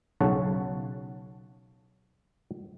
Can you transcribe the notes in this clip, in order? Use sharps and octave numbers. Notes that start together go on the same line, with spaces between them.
B1 C#3 C#5 F#5 A5